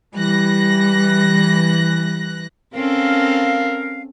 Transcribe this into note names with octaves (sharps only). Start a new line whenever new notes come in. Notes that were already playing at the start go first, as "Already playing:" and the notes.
E3 G3 F#6 A#6
C4 C#4 A4 A#4 F5